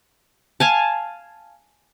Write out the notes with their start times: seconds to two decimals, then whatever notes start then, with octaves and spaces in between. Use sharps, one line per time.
0.60 F5 G#5 A5